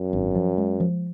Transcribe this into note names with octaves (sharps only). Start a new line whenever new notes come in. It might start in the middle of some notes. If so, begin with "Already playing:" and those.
Already playing: F#2
G#1
F3
G#3
F3